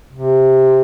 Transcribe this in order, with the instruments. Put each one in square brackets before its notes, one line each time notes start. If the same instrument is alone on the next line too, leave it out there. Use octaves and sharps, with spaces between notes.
[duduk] C3